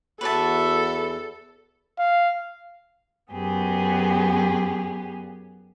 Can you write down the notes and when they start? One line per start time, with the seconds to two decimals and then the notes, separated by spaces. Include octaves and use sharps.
0.21 E2 F#4 A4 B4 E5 A5
1.99 F5
3.33 F#2 B3 G4 G#4